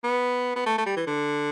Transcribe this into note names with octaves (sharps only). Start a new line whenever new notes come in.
B3
B3
A3
A3
G3
E3
D3